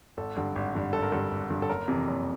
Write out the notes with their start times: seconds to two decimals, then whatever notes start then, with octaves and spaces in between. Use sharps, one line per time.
0.17 G#1 A4
0.36 G2 D3
0.56 G#1
0.75 G2 D3
0.93 G#1 A4
1.02 A#4
1.12 G2 D3 A4
1.31 G#1
1.50 G2 D3
1.62 A4
1.69 F#1 A#4
1.88 F2 C3 E3
2.07 F#1